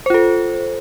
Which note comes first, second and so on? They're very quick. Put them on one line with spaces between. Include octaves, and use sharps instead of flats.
C5 F4 A4